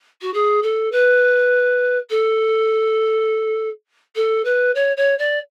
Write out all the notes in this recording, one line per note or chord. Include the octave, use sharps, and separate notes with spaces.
F#4
G#4
A4
B4
A4
A4
B4
C#5
C#5
D5